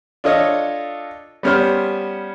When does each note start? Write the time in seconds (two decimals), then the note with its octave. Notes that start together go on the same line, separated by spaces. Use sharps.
0.24 D4 F4 A4 C#5 D#5
1.43 G3 B3 C#4 G4 C5 F6